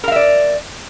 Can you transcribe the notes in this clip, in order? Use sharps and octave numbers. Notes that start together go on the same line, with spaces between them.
A#4 D5 E5 F5